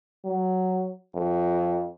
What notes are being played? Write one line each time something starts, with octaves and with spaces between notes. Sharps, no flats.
F#3
F2